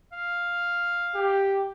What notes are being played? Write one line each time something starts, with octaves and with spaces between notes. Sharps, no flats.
F5
G4